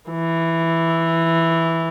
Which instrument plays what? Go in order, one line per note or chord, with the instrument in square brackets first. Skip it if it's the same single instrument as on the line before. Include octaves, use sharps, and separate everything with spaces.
[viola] E3